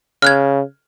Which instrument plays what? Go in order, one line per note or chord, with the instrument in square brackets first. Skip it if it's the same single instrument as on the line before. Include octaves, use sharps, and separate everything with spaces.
[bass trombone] C#3 [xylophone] F6 F#6 G#6